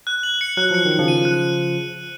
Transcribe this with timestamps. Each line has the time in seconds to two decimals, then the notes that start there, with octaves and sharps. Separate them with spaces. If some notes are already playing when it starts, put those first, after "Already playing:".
0.07 F#6
0.23 F#7
0.41 C#7
0.57 F#3 F#6
0.71 F3 C#7
0.85 D#3
0.91 C#7
0.99 C#3 F3
1.08 D#7
1.25 F#6